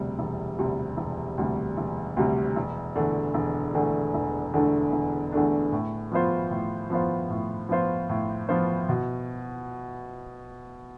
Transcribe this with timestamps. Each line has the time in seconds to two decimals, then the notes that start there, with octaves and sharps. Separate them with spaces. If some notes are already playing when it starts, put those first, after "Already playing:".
Already playing: E1 D2 C3 G3
0.19 E1
0.59 D2 C3 G3
0.97 E1
1.38 D2 C3 G3
1.77 E1
2.17 D2 C3 G3
2.56 E1
2.96 E2 D3 A3 D4
3.34 E1
3.74 E2 D3 A3 D4
4.14 E1
4.53 E2 D3 A3 D4
4.93 E1
5.32 E2 D3 A3 D4
5.72 A2
6.12 F3 B3 F4 C5
6.51 A2
6.90 F3 B3 F4 C5
7.30 A2
7.69 F3 B3 F4 C5
8.09 A2
8.49 F3 B3 F4 C5
8.89 B2